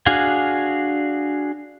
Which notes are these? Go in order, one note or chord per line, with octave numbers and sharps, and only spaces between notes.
D4 F#4 G#4 F5 G#5